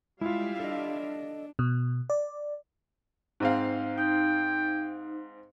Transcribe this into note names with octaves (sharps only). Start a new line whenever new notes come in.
G3 G#3 E4 F4 E5 F5
D4 A4 D#5
B2
D5
G#2 C4 F5
D#4 G5